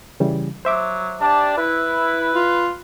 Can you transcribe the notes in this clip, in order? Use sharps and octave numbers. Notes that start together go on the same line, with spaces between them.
C#3 E3 G3
F#3 C5 E5 D6
D4 G4 D5 A5
E4 B4
F4